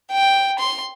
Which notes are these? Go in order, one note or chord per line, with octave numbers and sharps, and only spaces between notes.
G5
C6